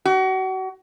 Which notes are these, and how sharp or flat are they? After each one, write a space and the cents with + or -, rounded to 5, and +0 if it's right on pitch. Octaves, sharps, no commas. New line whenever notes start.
F#4 +35